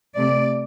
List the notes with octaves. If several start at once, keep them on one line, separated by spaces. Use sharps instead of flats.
C3 A3 C4 D5